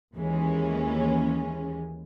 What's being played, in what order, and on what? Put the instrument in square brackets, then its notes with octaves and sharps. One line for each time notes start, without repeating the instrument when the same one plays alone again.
[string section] D#2 E3 G#3 C#4